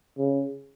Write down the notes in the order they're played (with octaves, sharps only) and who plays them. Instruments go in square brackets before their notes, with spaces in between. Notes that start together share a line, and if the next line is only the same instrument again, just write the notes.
[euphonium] C#3